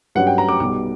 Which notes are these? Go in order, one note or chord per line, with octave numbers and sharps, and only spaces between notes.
G2 F#3 C#4 F#5
G5
A#5
D6
B1 B2 G3 D6